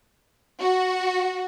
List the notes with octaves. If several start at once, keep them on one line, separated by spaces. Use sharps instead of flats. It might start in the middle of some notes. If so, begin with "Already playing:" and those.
F#4